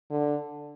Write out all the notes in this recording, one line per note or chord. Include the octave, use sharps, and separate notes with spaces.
D3